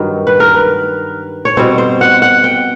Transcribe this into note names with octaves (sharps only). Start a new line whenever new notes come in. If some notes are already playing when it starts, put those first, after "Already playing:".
Already playing: G2 D#3 F#3
B4
A#4
B4
C#5
B2 G3 C4 C5
C5
F#5
F#5
G5